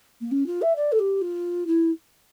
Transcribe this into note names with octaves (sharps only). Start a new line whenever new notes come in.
A#3
C#4
F4
E5
D5
A4
G4
F4
E4